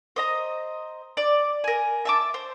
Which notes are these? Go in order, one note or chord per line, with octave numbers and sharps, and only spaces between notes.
C5 D#5 A#5
D5
A#4 G#5
E5 A5 D6
C5